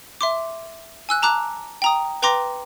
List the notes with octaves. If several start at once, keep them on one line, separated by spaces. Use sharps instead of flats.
E5 C6 D6
G#5 E6 F#6
A5 A#5 D6 F#6
G5 A#5 D#6
B4 G5 A#5 C6 D6 A#6